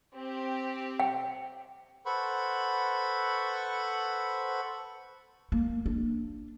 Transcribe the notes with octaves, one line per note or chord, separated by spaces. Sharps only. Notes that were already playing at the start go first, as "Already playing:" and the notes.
C4 G4
G5
A4 B4 C5 F#5 B5 C#6
A#3
D4